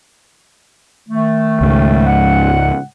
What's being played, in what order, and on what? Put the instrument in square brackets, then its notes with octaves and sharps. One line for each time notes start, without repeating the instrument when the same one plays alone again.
[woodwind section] D#3 A3
[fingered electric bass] C#2 G#2
[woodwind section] F#5